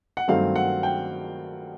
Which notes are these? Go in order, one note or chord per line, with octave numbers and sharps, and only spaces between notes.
F#5
G2 D#3 F#3 A3 C4 F5
F#5
G5